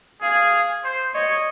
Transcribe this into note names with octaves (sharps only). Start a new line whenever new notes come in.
G#4 F5
C5
C#5 D#5